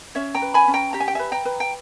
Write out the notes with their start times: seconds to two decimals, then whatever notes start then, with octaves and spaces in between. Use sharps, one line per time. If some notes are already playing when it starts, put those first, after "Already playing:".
0.15 C#4 C#5 E5
0.34 G5 A#5
0.42 B4
0.54 G#5 B5
0.68 C#4
0.74 G5 A#5
0.93 G4 A#5
1.00 G#5
1.08 G5
1.15 B4 E5 G#5
1.32 G5 A#5
1.45 B4
1.60 G5